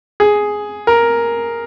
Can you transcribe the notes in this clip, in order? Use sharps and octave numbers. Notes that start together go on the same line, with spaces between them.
G#4
A#4